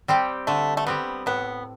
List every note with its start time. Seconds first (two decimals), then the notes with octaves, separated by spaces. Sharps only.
0.08 G3 C4 G4
0.47 D3 A3
0.77 A3
0.87 G3 B3 C4 G4
1.26 A2 B3